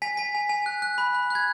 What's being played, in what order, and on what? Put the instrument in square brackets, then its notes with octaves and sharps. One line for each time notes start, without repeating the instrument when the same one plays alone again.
[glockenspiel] G#5 B6
G#5 B6
G#5
G#5
F#6
F#6
B5
F#6
F#6 G#6